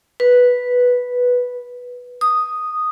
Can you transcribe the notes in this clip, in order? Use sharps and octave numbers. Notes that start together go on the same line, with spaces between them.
B4
D#6